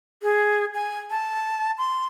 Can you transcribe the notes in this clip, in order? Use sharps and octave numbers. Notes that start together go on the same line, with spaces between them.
G#4
G#5
A5
C6